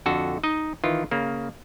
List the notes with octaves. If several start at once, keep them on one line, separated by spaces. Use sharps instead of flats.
F2 D3 F#4 A4
D#4 D#5
D#3 E3 F4
C#3 A#3